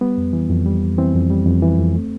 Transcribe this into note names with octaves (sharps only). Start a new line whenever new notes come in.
G3 B3
F2
E3
F2
G3
F2
E3 C4
F2
G3
F2
E3
F2
A3